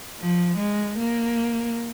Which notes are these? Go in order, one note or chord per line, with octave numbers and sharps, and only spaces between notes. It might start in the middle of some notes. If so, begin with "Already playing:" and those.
F3
G#3
A#3